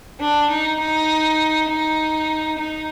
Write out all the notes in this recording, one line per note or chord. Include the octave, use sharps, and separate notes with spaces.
D4
D#4
D#4
D#4
D#4